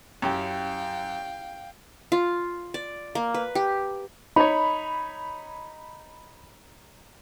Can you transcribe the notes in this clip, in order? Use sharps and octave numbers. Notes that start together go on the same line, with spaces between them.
F#2 C#4 E4 G4 F5 G5
F4
D5
A#3
B4
G4
D#4 C#5 B5